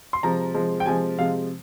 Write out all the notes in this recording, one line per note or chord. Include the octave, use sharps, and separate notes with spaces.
C6
C3 F3 G#3 A#5
C3 F3 G#3
G5
C3 F3 G#3 G#5
C3 F3 G#3 F5